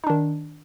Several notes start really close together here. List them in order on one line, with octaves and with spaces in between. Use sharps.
D#4 D4 D#3